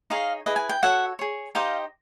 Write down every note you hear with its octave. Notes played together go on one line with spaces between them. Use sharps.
D#4 G#4 C#5 D#5 F5
E4 G#4 B4 D#5
G#5
G5
F#4 A4 C#5 E5 F#5
G#4 C#5
D#4 G4 C5 D#5 F5 G5